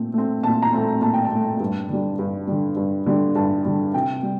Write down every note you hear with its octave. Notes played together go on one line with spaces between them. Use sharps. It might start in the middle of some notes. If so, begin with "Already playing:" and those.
Already playing: A#2 A3 C4
A3 C4
A#2 A5
A#5
A3 C4
A#2 A5
G5
A5
A3 C4
G2
D3 G3
G2
D3 G3
G2
D3 G3
G2 A5
D3 G3
C3 G5
G3